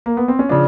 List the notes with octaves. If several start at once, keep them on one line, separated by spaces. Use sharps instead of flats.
A#3
B3
C4
C#4
C#3 F3 D4